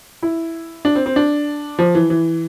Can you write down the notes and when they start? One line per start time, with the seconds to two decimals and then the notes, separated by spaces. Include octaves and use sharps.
0.23 E4
0.85 D4
0.95 C4
1.06 C4
1.16 D4
1.79 F3
1.95 E3
2.10 E3